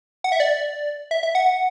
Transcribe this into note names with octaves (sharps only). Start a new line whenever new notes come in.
F#5
E5
D5
E5
E5
F#5